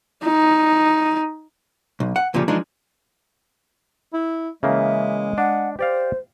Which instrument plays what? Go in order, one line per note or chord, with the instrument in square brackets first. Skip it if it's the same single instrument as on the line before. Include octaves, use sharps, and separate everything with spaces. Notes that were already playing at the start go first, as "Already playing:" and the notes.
[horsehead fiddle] D#4
[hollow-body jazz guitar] B1
F#5
D2 A#2 C#3 F3 G3
E3 F3 G#3 D4 D#4
[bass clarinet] E4
[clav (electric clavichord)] C#3 E3 A#3 [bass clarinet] G#3 [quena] E5
[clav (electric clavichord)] D4 [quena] F#5
[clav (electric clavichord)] G4 D5 F5 [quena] C5